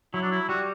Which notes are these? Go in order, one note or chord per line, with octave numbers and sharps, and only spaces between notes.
F#3 E4
D4
E4
G3 F#4